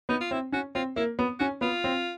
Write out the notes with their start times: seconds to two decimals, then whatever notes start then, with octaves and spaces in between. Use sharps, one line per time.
0.09 B3 D#4
0.21 F4
0.31 C4 E4
0.52 C#4 F#4
0.75 C4 F4
0.96 A#3 E4
1.19 B3
1.40 C#4 F#4
1.61 B3 F4
1.84 C4